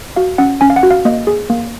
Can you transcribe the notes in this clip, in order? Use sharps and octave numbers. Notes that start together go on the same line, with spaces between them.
F#4 F5
C#4 F#5
C#4 G#5
F5
F#5
F#4
F5
A#3 D#5
G#4
A#3